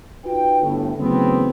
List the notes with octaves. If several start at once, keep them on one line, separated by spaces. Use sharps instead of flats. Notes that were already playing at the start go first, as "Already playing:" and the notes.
D#4 F4 F#4 B4 G5
G1 A2
C#3 E3 F#3 A3 B3 C4